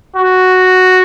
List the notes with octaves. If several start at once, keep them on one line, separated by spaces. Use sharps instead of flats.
F#4